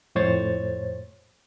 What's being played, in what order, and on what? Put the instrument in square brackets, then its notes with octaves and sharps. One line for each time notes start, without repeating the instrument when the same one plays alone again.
[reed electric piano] F2 A2 C5 C#5 A6